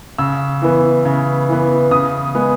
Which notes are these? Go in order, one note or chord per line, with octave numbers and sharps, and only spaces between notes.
C#3 E6
E3 B3
C#3
E3 B3
C#3 D#6
G#3 B3